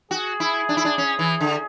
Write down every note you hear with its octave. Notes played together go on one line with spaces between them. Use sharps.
F#4 G#4
E4
D4
E4
D4
C#4
E3
D3